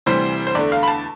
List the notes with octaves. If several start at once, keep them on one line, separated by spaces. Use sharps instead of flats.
D2 C3 E3 G3 C5
C5
E2 D3 A3 D5
F5
B5
A5